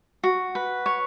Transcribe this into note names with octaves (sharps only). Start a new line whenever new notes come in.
F#4
B4
C#5